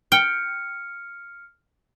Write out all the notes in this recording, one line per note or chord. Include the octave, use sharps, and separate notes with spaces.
G5 F6 C#7